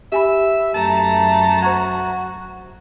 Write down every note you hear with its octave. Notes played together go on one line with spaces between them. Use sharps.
G4 E5 G#5 B5
F#2 A3 A5 A#5
F#4 C5 C#6 G#6